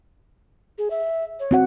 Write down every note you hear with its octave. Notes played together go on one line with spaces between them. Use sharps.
G#4
E5
C#5
C4 F#4 F#5